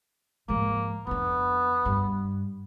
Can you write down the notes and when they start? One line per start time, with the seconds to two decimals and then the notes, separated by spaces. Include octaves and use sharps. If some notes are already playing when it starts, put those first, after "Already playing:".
0.48 G#2 F3 A#3
1.07 F2 D3 B3
1.85 G2